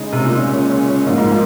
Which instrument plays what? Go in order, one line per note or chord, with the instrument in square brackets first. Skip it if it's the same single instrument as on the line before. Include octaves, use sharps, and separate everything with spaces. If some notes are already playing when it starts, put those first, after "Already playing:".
Already playing: [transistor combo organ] C#3 G#3 D#4
[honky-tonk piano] C3
A#2
[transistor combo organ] C#3 G#3 C#4
[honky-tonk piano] G#2 [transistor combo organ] F3 A#3 D#4
[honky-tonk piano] G#2
A#2